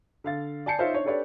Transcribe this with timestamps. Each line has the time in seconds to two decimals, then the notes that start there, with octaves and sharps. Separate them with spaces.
0.24 D3 F5 A6
0.66 D5 G#5 A5 G6 C7 C#7
0.79 D#4 F4 C5 C#5 E5 F5
0.93 D4 C#5
1.05 D4 G4 A4 B4 C#5 D5